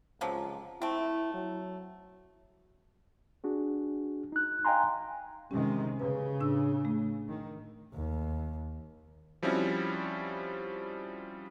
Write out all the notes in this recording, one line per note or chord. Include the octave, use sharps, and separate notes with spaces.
C#2 C3 F3 F#3
A3 C4 E4
F#3
D4 F#4 G#4
D#4 F#6
D#5 F5 G5 G#5 A#5 C6
C3 D#3 G#3 C#4 G4
C#3 B4
A2 D4 E6
A3
D#3
D#2
F3 G3 C4 C#4 E4 F#4